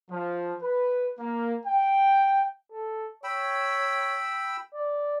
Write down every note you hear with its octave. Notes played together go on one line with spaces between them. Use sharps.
F3
B4
A#3
G5
A4
C#5 G5 B5 E6
D5